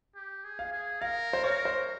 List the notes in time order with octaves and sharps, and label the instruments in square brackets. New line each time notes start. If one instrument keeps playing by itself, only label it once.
[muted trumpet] G4
G#4
[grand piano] F5
[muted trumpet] G#4
[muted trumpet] A#4 [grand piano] F5
[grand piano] C5
[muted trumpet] A#4 [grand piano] C#5
[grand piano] C5